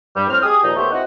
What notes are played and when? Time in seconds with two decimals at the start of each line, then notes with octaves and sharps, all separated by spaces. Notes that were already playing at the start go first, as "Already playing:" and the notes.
0.16 G2 G3
0.28 A2 C4 F6
0.43 G4 G#4 D#6
0.64 D#2 A#2 F3 D#4
0.76 D#2 A3 B3 G4 C5 C#5
0.92 C4 D#4 E4 F#4 F#5